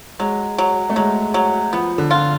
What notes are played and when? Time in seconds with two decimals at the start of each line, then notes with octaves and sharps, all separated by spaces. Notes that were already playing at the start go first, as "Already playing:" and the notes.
0.19 F#3 G#3
0.58 F#3
0.90 A3
0.96 F#3 G#3
1.34 F#3
1.73 F3 B3
1.98 D3
2.11 F4